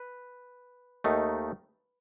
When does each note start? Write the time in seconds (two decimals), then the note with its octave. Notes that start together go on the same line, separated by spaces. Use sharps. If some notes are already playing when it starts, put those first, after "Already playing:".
Already playing: B4
1.04 D#2 D#3 A3 D#4